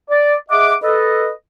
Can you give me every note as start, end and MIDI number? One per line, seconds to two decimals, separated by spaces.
0.10 0.35 74
0.50 0.74 68
0.50 0.74 75
0.50 0.74 76
0.50 0.74 78
0.50 0.74 86
0.83 1.30 69
0.83 1.30 71
0.83 1.30 75